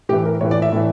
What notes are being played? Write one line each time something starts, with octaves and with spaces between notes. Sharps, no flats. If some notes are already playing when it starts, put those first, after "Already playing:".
A2 E3 G4
A#4
A2 E3 C#5
D5
E5
A2 E3